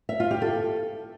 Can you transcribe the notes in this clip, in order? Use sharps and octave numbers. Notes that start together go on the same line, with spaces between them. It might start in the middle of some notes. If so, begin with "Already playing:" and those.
E5
F4
G4
A4